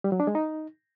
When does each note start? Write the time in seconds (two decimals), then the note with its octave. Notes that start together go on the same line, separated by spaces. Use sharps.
0.04 G3
0.12 F#3
0.20 D4
0.27 G#3
0.35 D#4